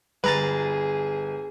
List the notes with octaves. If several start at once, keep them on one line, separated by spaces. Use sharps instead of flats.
G1 G#4 B4 A#5 A6